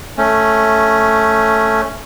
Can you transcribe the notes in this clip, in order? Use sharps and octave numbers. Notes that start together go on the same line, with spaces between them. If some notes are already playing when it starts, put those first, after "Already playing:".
A3 C#4